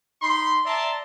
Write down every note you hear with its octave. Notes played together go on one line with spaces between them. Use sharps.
D#4 B5 C6
D5 E5 A5 A#5 C6